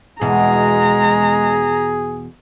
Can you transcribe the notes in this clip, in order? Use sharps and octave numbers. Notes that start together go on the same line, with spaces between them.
E2 B2 G#3 G#4 A#5